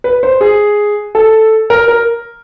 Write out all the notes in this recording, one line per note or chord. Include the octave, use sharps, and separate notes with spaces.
B4
C5
G#4
A4
A#4
A#4